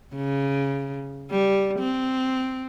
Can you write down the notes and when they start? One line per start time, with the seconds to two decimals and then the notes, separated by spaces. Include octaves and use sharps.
0.15 C#3
1.31 G3
1.79 C4